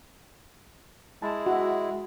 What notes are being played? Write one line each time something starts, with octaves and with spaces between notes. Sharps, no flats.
G#3 E4 A5
F#4 E5